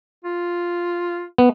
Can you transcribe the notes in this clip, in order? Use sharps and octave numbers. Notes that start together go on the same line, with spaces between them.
F4
B3